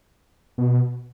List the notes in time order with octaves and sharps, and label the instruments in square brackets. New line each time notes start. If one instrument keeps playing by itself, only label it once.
[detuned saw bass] B2